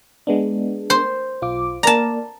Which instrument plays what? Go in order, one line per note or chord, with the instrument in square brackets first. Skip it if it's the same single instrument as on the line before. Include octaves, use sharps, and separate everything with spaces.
[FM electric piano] G#3 B3 D4
[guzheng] C5
[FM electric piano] B1 F4 D6
[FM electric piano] A#3 A#4 D5 [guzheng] A5 A#5